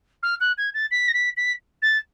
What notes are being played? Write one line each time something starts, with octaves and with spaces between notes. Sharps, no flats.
F6
F#6
G#6
A6
B6
A#6
B6
B6
A6